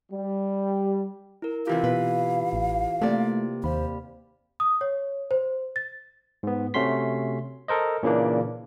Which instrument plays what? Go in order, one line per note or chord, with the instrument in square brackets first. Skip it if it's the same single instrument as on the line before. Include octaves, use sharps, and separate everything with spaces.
[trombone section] G3
[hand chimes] E4 A#4
[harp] C3 E3 G4 [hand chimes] E4 F4 [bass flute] F5
[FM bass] B2 [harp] B4
[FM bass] A1
[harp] C3 A#3 D5 [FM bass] A3
[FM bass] D#2 [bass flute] C5 [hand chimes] F5 B5
[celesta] D#6
C#5
C5
A6
[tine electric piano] G#2 B3
C3 A3 C#4 F#4 C6 B6
A4 A#4 C5 D#5
A#2 C#3 E3 A#3 D4